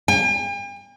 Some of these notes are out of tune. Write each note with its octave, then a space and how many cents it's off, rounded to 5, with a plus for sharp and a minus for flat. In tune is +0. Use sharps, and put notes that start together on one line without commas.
G5 +45